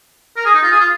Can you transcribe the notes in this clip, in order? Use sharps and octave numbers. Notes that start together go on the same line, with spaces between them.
A#4
G#4
D#4
F4
G#4
F4